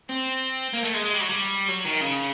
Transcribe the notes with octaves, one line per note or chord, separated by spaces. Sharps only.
C4
A#3
A3
G#3
G#3
G3
F#3
G3
F#3
D#3
C#3